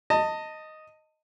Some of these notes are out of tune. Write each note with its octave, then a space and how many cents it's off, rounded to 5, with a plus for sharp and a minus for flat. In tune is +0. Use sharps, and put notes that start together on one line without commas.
D#5 +0 A5 +30